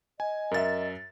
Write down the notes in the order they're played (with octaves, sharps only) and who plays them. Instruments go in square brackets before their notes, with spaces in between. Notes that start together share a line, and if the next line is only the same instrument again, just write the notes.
[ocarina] D#5 [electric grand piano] G#5
[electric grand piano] F#2 A6 [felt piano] A#4 E5